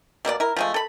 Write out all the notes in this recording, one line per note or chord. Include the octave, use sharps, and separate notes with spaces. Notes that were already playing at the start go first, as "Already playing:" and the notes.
B2 A#3 B3 D5
E4 A#4
F3 G#3 A3
A4 B5